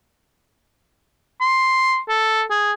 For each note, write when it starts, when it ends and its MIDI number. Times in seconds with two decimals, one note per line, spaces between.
1.41 1.99 84
2.09 2.43 69
2.51 2.72 68